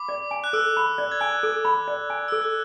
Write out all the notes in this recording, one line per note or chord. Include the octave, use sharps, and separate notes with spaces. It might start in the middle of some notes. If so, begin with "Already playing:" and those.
Already playing: B5 D6
D5
G#5
F#6
A4 E6
B5
D5
G#6
G#5 F#6
A4
B5
D5
G#5
A4 E6
F#6